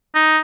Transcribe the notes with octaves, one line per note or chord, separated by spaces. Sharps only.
D#4